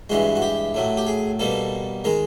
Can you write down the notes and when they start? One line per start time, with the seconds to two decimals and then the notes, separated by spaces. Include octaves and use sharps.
0.10 G2 E3 G#3 F#4
0.36 F#4
0.42 G4
0.74 A2 F#3 A3
0.97 G4
1.07 G#4
1.39 B2 G3 A#3 A4
2.04 D#3 G#3 A#4